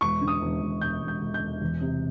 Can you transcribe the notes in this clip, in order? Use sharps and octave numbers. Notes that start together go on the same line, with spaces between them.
E1 C#6
D3
D#6
E1
E1
E1 G6
E1
G6
E1
G6
E1
E2
C3